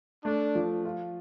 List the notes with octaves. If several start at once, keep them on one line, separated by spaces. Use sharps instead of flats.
A3 D4
F3
F4